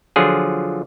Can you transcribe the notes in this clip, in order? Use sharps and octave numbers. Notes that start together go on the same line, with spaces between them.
D3 F3 F#3 F4 G#4